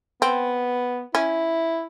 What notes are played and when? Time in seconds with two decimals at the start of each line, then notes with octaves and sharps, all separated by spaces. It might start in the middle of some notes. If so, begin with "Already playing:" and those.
0.22 B3 C4
1.15 C#4 E4